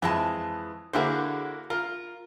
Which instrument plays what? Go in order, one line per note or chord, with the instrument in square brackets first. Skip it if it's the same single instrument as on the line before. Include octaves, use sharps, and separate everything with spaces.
[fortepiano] F2 [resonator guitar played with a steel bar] E3 G#3 A5
[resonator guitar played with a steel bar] D3 F#4 G#4 [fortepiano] A#3 E4 C5
[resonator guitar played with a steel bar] F4 [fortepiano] A#4